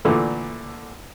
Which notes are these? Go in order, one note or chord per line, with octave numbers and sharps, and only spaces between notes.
A#2 D3 E3 A3